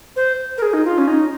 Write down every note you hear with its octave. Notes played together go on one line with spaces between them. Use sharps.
C5
A#4
G#4
D#4
F4
C#4
D#4